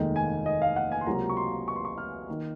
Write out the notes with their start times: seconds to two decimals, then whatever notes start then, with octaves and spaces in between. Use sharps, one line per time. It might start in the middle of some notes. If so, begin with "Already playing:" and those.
Already playing: F1 D#2 D#3 G#3
0.16 G#5
0.46 D#5
0.62 F5
0.76 F#5
0.92 G#5
1.01 C6
1.07 C#2 C3 F#3 A#3 A#5
1.30 C#6
1.37 C6
1.68 C#6
1.76 C6
1.85 C#6
1.98 F6
2.28 D#3 A#3